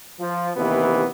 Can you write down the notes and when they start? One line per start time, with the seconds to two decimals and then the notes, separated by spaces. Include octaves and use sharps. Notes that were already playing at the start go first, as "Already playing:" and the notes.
0.20 F3
0.56 D#2 C3 E3 B3